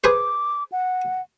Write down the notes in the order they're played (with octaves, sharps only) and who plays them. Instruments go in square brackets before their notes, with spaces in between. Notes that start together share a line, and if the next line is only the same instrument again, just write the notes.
[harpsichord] G#4 B4 C5 [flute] D6
[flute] F#5